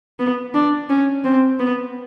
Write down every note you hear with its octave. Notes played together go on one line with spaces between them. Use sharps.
B3
D4
C#4
C4
B3